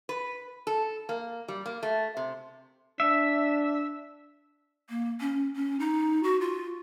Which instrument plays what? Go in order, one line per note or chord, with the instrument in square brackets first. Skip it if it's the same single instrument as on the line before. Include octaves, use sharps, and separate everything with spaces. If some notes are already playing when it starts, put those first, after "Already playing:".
[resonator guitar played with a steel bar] B4
A4
A#3
G3
A#3
A3
C3
[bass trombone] D4 [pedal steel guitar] E5
[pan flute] A#3
C#4
C#4
D#4
F#4
F4